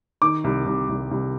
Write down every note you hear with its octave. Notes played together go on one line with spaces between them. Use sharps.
D#3 D6
C2
C2
C2
C2